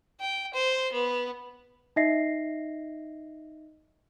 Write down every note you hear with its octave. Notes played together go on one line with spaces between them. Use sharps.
G5
C5
B3
D#4 D#5 E5 A#6 C7